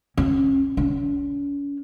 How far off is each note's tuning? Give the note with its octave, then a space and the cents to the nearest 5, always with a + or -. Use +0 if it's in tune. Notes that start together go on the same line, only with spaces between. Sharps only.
C#4 -25
C#4 +35